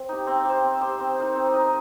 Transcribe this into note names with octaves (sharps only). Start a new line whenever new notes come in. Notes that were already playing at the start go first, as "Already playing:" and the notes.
Already playing: C4
D#4 G4
C4
G4 C5
C4
G4 C5
C4
D#4 A#4 D#5
C4
D#4 A#4 D#5